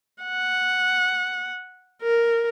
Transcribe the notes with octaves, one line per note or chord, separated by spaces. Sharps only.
F#5
A#4